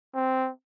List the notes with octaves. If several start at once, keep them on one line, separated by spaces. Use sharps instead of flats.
C4